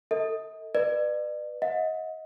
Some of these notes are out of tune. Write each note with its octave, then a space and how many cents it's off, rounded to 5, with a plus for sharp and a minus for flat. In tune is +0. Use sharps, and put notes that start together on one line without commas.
A4 +30 D#5 +40
B4 +0 D5 +40
D#5 +30 F#5 -40